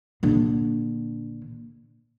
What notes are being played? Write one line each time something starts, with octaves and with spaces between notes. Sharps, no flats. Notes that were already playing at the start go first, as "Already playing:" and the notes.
A#1 D3